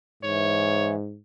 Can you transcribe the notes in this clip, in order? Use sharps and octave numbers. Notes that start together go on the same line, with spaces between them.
G#2 E3 C#5